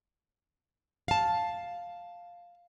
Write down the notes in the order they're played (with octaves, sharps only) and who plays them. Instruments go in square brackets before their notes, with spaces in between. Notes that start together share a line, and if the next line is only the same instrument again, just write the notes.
[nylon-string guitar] F5 A5